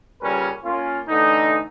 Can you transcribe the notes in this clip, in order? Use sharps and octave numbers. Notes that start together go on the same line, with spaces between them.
A#2 C#3 G3 C#4 A#4 B4
A#3 C#4 F4
D3 E3 A3 D#4